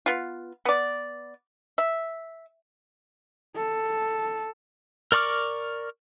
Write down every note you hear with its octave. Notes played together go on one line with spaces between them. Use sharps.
B3 F4
B3 D5
E5
A4
A#4 D5 C#6 D6 F6